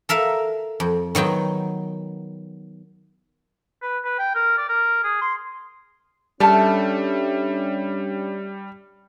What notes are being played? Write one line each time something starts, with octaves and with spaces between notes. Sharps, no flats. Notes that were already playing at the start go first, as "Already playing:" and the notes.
A4 A#4 E5 F5
F2
D#3 F#3 B3 G5
B4
B4
G5
A#4
D5
A#4
G#4
C6
G3 A3 C#4 D4 A5 F6